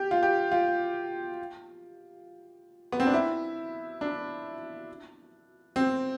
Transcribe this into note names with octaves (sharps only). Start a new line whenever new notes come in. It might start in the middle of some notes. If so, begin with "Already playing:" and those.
Already playing: G4
F4
G4
F4
B3
C4
D4
E4
D4
C4